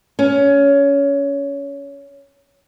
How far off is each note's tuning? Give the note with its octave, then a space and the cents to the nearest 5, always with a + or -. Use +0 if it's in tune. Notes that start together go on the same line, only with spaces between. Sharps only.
C#4 +20